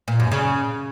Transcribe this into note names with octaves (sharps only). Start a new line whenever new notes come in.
A#2
F#2
C#3